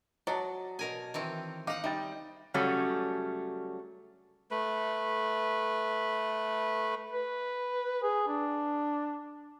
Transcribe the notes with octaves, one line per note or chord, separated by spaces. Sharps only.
F#3 D5 D#5 A5
B2 A#4 G#5
D#3 E3 C4
D#4 D#5 F5 F#5 D6
G3 D#4 G5 A6
C#3 F#3 G3 A3 C#4
A3 B4
B4
G#4
D4